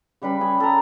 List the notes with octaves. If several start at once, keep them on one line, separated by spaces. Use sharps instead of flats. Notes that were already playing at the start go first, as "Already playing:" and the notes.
C#3 G3 B4 B5
G#4
A4 A#5